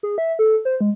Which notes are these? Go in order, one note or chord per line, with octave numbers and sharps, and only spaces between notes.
G#4
E5
A4
C5
G#3